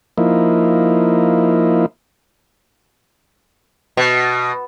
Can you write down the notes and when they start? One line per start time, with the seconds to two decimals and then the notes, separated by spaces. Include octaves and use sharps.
0.18 F3 A#3 D#4 E4
3.97 B2